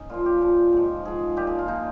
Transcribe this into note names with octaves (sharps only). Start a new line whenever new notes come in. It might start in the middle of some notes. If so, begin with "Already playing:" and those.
Already playing: C#4 D#4
A#2 F3 F4
G4
A#2 F3
G#2 F3
G#2 F3 G#4
A#2 F3 G4
G#4
F4
A#2 F3 D#4